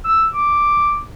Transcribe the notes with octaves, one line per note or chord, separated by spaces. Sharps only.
E6
D6